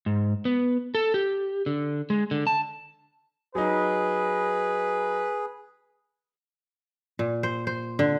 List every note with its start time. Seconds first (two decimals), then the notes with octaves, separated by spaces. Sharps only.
0.06 G#2
0.45 B3
0.95 A4
1.14 G4
1.66 D3
2.10 G#3
2.31 D3
2.47 A5
3.55 F#3 D#4 G#4 B4
7.19 A#2
7.43 C5
7.67 C5
7.99 D3